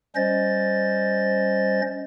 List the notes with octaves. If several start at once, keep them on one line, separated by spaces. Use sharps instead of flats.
G3 C#4 C5 D#5 A6